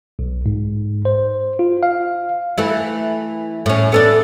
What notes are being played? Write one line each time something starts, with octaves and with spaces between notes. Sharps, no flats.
B1
G#2
C5
F4
F5
E3 A3 E4
A2 C#4
B3 C#4 D4 A4